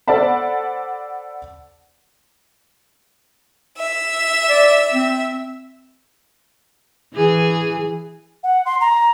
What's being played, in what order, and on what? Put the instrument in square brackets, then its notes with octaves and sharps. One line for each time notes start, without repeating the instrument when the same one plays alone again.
[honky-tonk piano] A4 C5 D5 F#5 A5 B5
[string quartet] E5
[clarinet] D5
C4
[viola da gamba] E3 G#4
[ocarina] F#5
C6
A#5